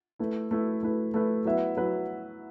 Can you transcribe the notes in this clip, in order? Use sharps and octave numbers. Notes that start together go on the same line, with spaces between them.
A3 E4 B4
A3 E4 B4
A3 E4 B4
A3 E4 B4
F#3 B3 E4 B4 E5
F#3 E4 B4